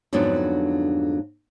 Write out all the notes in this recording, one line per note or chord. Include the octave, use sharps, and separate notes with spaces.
F2 G#2 D3 F#3 B3 D4